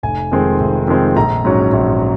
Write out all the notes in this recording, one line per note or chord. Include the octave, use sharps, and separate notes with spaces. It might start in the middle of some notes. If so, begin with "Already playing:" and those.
F1 G#5
F2 D#3 G#3 C4
F1
F2 D#3 G#3 C4
A#1 A#5
G#2 F#3 C#4
A#1